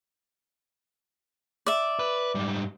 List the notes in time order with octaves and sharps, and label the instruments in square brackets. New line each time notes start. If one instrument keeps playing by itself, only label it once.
[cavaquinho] D5 E5
[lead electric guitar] B4
G#2 G3